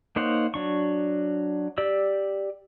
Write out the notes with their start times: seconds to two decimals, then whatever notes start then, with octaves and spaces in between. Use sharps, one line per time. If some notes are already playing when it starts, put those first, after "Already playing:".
0.16 A#3 D#4 C5 C#5 F#5
0.54 F#3 D4 C#6
1.78 G4 D5 E6